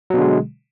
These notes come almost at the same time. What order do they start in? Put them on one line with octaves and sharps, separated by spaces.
F#3 B2 D3 G#3